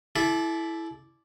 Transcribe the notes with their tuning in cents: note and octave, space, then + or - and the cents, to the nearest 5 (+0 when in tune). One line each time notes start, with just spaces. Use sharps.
E4 +0 A4 -40 D5 +0